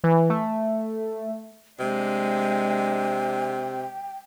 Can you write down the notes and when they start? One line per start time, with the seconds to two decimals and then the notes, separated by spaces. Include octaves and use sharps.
0.04 E3
0.30 A3
1.80 C3 G#3 D4 G5